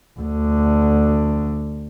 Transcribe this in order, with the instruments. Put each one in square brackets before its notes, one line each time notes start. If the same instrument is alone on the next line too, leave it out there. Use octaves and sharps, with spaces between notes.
[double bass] D2 D3